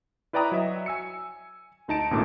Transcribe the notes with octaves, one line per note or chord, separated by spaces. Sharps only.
E4 B4 D5 G5 A#5 D#6
F#3 D#5 E5
G#5 E6 C#7
D2 D#4 A5 D7
G#1 C#2 A#2 A3 D6